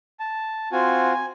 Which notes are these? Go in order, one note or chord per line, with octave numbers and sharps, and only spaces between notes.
A5
C4 F4 F#4 G#5
G#5